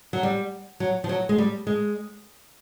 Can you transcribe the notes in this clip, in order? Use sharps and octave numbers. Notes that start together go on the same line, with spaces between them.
F#3
G3
F#3
F3
F#3
G#3
G3
G#3